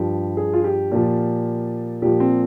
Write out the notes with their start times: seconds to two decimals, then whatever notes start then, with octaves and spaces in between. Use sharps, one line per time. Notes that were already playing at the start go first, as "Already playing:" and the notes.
Already playing: G2 F3 G4
0.37 G#4
0.53 F4
0.64 G4
0.92 A#2 F3
2.02 A#2 F3 G4
2.20 C4